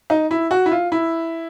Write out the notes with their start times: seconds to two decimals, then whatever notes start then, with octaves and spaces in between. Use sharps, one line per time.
0.10 D#4
0.31 E4
0.51 F#4
0.66 E4
0.72 F4
0.92 E4